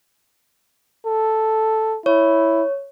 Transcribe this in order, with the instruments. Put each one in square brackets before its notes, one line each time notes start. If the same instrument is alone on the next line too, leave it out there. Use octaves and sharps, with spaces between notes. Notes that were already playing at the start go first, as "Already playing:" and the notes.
[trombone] A4
[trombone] E4 [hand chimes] C#5